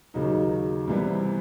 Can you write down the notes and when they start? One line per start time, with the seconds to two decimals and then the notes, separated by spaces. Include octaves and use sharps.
0.14 D#2 C#3 F#3 A#3 D#4
0.87 C2 C3 E3 G3 B3